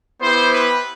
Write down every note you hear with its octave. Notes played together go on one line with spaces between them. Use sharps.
B3 E4 G4 C5
B4